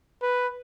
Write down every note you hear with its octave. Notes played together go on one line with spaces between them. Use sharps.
B4